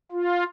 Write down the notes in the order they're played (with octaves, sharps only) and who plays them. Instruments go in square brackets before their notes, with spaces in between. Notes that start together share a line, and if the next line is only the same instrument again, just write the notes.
[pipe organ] F4